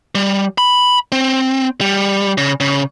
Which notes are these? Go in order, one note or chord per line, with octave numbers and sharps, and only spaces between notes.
G3
B5
C4
G3
C#3
C#3